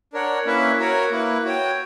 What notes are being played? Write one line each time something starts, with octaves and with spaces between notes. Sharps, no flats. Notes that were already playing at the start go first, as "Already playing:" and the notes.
D4 A#4 C#5 F#5
A#3 C#4 E4 B4 E5
F#4 A#4 C#5 F#5
A#3 E4 B4
F#4 C#5 G5